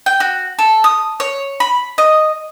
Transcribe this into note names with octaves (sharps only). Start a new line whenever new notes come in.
G5
F#4
A4
D#6
C#5
B5
D#5